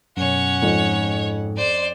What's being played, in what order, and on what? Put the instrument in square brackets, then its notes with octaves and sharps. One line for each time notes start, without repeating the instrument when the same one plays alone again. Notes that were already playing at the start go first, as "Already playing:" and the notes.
[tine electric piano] F#2 B2 [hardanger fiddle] C#4 F#5 [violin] C#5
[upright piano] F2 [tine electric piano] G#2
[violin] C5 D5